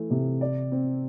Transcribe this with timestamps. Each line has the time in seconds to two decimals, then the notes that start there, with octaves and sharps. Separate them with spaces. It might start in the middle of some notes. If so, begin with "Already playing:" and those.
Already playing: E3 A3
0.10 C3
0.41 D5
0.72 C4